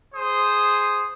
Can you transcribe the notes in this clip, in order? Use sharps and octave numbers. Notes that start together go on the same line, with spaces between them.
G#4 C5 D#6